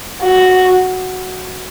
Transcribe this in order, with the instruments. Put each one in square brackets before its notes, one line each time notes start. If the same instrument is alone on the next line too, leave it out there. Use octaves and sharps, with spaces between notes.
[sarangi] F#4